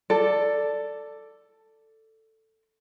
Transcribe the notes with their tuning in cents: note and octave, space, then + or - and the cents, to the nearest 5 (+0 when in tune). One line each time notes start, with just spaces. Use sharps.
A4 +10 D5 -5